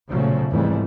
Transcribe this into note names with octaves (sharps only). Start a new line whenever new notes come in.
B1 A#2 C#3 F3 F#3 A3
F2 G#2 E3 G3 A3